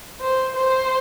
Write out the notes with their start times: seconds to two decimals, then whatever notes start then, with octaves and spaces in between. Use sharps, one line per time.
0.21 C5
0.56 C5